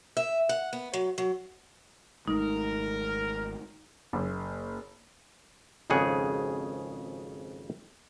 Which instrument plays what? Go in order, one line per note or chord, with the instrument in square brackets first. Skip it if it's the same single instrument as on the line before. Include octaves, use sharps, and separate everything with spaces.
[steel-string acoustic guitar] E5
F#5
B3
F#3
F#3
[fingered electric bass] G#1 G#3 A3 [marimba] D#4 [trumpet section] A#4
[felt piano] F#1
[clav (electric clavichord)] G#1 F2 C#3 G#4 F#5